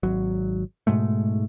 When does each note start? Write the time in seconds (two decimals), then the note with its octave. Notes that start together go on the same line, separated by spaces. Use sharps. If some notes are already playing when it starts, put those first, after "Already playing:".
0.03 G#1 F#3
0.87 G#2 B2 G#3 A3